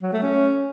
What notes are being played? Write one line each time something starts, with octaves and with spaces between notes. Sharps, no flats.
F#3
A3
C#4